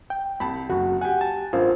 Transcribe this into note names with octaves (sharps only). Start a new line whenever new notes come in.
G5
C2 A5 B5
F#1 F#4
G4 F#5 G#5
A5
A1 G2 F4 A#4 C5